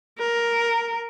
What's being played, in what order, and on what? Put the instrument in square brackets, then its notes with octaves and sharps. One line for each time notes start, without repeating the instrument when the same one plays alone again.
[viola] A#4